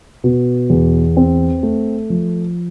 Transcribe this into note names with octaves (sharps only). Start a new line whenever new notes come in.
B2
E2
C4
A3
F3